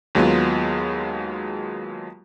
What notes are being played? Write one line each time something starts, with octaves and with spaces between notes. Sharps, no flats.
D#2 F#3 G#3 B3 F4